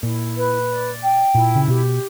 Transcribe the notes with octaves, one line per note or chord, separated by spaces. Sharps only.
A#2 E4
B4
D5
G5
A#2 E4
C#3
B2 G4